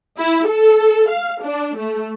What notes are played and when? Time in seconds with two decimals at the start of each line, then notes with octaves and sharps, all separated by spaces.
0.18 E4
0.47 A4
1.09 F5
1.42 D4
1.77 A3